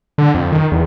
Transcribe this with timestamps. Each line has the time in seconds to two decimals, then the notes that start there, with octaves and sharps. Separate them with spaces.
0.18 D3
0.35 F2
0.52 D#3
0.72 E2